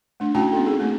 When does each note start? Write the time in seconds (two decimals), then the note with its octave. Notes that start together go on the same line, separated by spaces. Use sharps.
0.20 A3 D4
0.35 A3 C#4 E4 F#4 G5 A5
0.52 B3 C4 D4 A4
0.66 D#4 G#4
0.80 A3 A#3 C4 E4